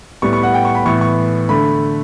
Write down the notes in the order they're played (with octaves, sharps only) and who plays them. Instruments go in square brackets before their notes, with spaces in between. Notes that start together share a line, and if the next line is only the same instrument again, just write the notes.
[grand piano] A2 G3 B3 C#6
C#6
F#5
G5
C#6
B5
A2 E3 B3 C#6
C#6
D3 A3 B5